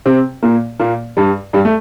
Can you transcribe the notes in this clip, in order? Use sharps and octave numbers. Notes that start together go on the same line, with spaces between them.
C3 C4
A#2 A#3
A#2 A#3
G2 G3
G2 G3
A3